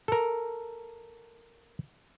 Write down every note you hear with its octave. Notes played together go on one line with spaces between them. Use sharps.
A4 A#4